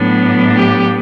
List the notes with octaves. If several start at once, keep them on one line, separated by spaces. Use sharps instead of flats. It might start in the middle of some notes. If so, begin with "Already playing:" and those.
Already playing: A2 F#3 B3 D4
G4